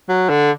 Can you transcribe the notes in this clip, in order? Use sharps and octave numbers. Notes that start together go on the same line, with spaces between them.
F#3
D3